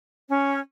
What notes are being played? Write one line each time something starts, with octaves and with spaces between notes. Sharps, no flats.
C#4